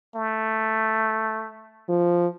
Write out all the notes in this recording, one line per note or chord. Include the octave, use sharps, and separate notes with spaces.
A3
F3